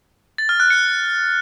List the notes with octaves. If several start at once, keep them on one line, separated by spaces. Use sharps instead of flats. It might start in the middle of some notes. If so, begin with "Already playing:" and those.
A6
F6
F#6
C#7